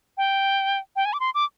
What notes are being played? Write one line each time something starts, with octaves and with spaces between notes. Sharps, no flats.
G5
G5
G#5
D6
C6
D6